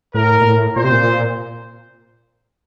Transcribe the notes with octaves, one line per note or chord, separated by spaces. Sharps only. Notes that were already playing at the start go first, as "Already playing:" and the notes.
A2 A#4
A#2
A2
A#2 C5
C3
A#2